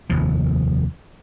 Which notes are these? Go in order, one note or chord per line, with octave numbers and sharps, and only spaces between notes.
F1 D#2 F3